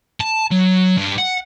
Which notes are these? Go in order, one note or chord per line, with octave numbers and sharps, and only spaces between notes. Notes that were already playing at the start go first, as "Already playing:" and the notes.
A5
F#3
G2
F#5